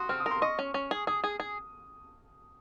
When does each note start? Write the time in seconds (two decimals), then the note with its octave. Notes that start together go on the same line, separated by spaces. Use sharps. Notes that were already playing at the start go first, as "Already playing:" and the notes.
Already playing: F#4 C6 D#6
0.09 C4 F6
0.20 D#6
0.26 A#4
0.31 C6
0.42 D#5 C#6
0.59 C#4
0.74 C#4
0.91 G#4
1.07 G#4 D#6
1.24 G#4
1.40 G#4